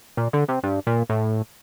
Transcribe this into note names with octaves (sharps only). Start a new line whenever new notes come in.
A#2
D3
C3
G2
A#2
A2